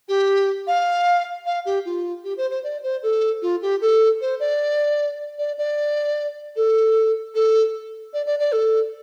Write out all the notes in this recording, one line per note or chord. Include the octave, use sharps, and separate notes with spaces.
G4
F5
F5
G4
F4
G4
C5
C5
D5
C5
A4
F4
G4
A4
C5
D5
D5
D5
A4
A4
D5
D5
D5
A4